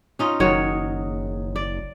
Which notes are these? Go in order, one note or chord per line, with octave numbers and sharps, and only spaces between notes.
C#4 D#4 F4
F#1 D#3 F#3 C#5
D5